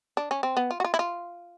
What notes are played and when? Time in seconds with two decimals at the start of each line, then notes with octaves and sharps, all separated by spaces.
0.17 D4
0.31 C#4
0.43 C4
0.57 B3
0.71 F4
0.80 F#4
0.85 F4
0.94 E4
0.99 F4